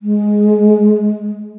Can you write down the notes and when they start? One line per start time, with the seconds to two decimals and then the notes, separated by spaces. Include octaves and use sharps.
0.02 G#3